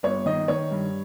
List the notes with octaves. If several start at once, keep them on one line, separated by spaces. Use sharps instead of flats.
G1 C#5
D#3 D#5
D#3 C#5
G2